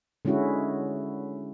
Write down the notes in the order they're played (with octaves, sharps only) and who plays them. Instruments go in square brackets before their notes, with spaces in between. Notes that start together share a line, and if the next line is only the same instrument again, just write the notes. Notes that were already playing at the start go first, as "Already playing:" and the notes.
[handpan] D3 G#3 C#4 E4 F#4